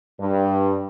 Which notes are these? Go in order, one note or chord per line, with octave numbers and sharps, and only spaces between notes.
G2